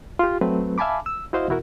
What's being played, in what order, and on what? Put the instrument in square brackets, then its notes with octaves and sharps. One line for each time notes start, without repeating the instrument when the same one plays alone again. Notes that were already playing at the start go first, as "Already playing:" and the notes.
[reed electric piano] F4 G4
F#3 A3 C4 B4
E5 F5 G#5 A5 B5 D6
E6
E4 F#4 C5 D#5 F5
E2 B2 E4 F#4 A#4